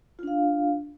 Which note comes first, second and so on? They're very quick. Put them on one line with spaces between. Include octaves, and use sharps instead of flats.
F4 D4 F5